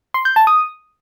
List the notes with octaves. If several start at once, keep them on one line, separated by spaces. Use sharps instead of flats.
C6
G6
A5
D#6